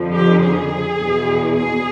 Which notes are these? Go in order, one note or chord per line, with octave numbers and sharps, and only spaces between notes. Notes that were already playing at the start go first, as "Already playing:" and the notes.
Already playing: F2 D3 F3
G4
G#4
E2 B2
G#4